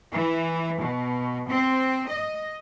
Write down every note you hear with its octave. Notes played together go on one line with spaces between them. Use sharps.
E3
B2
C4
D#5